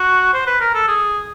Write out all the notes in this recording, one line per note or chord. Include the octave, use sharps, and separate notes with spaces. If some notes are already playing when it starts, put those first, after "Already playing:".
Already playing: F#4
C5
B4
A#4
A4
G#4